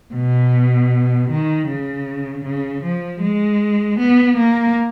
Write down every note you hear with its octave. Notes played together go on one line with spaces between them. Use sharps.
B2
D#3
C#3
C#3
F3
G#3
B3
A#3